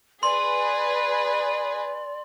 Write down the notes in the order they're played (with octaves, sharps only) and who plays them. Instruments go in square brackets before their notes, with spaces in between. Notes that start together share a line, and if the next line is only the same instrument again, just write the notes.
[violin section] G#4 B4 [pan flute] D5 [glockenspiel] C6